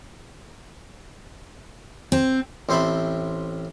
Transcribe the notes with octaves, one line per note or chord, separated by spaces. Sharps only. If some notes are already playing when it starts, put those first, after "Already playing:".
C4
A1 C4 C5 E5 A5 B5